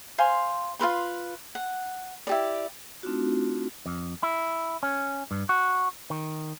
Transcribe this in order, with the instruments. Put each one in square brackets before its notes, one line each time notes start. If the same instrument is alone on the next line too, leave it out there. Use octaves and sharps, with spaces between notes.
[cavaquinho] C5 F5 G#5 C6
F4 A#4 B4 C6
F#5
E4 G4 D5
[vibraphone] A3 C4 D4 D#4 F4 F#4
[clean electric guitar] F2
E4
C#4
G2
F#4
D#3